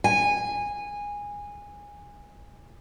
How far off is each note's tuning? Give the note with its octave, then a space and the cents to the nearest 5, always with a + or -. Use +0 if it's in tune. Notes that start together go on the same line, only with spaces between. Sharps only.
G#5 -15